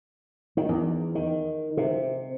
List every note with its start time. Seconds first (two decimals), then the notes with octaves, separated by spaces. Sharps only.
0.57 D#3
0.69 E2
1.15 D#3
1.77 C3